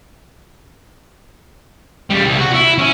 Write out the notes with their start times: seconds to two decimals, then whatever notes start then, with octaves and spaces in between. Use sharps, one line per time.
2.10 C#3 G3
2.24 C2
2.38 F#4
2.54 E4
2.78 C#4